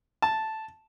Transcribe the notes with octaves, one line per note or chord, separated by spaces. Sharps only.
A5